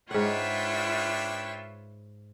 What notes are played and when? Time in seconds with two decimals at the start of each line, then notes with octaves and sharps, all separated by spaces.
0.11 G#2 D4 F4 B4 C#5 E5 F#5 G5